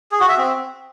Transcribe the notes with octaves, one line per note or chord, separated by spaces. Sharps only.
G#4
F#4
E5
C4